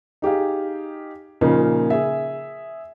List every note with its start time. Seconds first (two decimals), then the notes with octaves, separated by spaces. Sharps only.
0.22 D#4 G4 G#4 F5
1.41 A#2 C#3 F3 A#3 D#4
1.90 G#4 E5